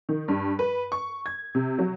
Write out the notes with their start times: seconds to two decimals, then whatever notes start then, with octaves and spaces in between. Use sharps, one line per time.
0.09 D#3
0.28 G2
0.59 B4
0.92 C#6
1.26 G#6
1.55 C3
1.78 F#3